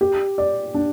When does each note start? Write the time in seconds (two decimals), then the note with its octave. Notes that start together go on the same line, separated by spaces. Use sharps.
0.01 G4
0.38 D5
0.74 D4